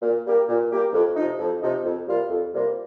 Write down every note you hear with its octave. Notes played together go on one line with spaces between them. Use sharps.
A#2
G3 A#3 G4
A#2
G3 A#3 G4
F2
C3 F3 D#4
F2
C3 F3 D#4
F2
C3 G3 A#3 F4
F2
C3 G3 A#3 F4